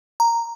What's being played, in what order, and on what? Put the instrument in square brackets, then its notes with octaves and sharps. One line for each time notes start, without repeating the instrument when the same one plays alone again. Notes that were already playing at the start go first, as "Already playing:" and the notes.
[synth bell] A#5